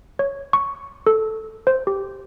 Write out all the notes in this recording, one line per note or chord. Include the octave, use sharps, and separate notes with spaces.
C#5
C#6
A4
C5
G4